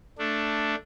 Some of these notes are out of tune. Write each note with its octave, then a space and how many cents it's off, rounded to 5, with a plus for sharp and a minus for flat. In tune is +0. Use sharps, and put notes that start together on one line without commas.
A3 +5 D4 +0